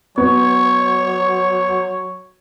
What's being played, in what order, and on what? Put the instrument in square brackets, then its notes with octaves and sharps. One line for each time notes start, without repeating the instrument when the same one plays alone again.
[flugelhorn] F#3 [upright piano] B3 [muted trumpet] C#5